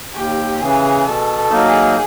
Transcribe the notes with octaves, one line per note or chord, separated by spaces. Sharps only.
D#2 G4
C#3 E3 G#4
B2 A4
A4
F#3 A#3 D#4
G#4